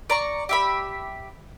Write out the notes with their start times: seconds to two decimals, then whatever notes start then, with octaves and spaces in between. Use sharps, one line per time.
0.10 D5 A#5 C#6
0.49 G4 E5 B5